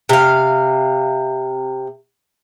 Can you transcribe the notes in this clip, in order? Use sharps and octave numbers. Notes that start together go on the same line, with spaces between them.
C3 F5